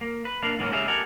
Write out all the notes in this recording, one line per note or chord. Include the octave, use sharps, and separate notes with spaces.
A#3
B4
A#3 D4 F5
G#2 E3 F#3 A#3 C4 C#4
G#3 C#4 G4 G#4 E5 F5
G4 A4 A#4 F#5 G#5